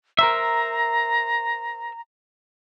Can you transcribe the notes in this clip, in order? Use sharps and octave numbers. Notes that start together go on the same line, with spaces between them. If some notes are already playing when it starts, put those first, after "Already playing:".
A#4 C5 E5 A#5